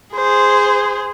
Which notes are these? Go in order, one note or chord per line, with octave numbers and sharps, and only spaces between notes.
G#4 C5